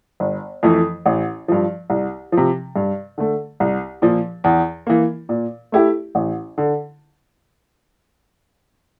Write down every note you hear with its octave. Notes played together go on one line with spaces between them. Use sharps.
G1
F2 E3 A3
A1
G2 F3
C2
C3 F3
G2
D3 A3
C2
A#2 F3
E2
E3 A#3
A#2
A3 E4 G4
A1
D3